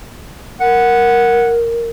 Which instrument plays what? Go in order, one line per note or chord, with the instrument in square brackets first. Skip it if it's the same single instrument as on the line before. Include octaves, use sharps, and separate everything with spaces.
[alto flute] A#4 [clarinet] F#5